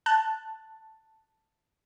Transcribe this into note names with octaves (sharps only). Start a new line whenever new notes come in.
A5 F#6